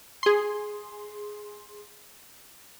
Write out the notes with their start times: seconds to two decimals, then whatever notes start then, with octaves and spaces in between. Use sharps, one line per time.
0.23 G#4 C6